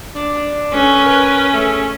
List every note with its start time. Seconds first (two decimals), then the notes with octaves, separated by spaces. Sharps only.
0.14 D4
0.73 C#4 A4 B4
1.05 A#4 B4
1.53 C#3 A3